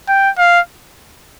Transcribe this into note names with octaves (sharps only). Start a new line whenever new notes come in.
G5
F5